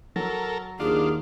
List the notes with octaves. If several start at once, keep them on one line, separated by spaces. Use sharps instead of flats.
F#3 A4 A#4
D#2 D4 F4 G#4